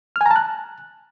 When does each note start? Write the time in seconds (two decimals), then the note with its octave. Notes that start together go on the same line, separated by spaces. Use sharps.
0.16 F6
0.21 G#5
0.26 A#5
0.31 A5
0.36 F#6